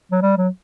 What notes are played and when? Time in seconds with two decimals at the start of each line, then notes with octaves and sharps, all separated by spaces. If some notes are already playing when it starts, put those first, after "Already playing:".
0.12 F#3
0.22 G3
0.37 F#3